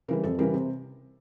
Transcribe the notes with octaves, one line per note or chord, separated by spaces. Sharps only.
C#3 E3 G3 A#4
F2 A4
C#3 E3 G3 A#4
C3